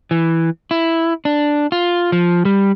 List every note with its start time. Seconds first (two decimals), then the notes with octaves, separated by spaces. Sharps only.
0.11 E3
0.71 E4
1.25 D4
1.72 F4
2.12 F3
2.45 G3